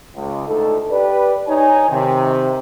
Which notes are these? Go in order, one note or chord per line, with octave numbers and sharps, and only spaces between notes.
C#2
D2 D#4 A4
G4 B4 D5
D#4 C#5 G#5
C3 D#3